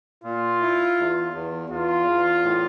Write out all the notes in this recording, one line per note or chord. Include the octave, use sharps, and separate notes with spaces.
A#2 F4
E4
E2
E2
E2 F4
E2
A2